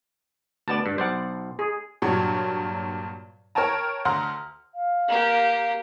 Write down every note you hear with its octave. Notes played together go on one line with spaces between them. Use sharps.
D2 B3 D5 A5
G2
B1 C5 D5 F#5
G#4
G2 A#2 F#3 C#5
A#4 C#5 G5 A5 A#5
D2 F#5 A#5 C6 F6
F5
A#3 G4